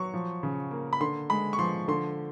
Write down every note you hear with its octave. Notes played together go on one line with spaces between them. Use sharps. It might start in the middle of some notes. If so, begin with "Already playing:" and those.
Already playing: F#3 C#6
F3
C#3
A#3
B5
D3 C6
G#3 B5
C#6
F3 C6
D3 C6